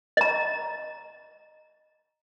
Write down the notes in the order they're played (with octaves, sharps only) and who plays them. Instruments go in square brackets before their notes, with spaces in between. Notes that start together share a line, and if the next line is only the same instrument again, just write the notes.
[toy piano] D#5 A#5